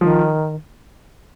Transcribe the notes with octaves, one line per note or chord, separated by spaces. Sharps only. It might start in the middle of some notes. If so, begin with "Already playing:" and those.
D#3 F3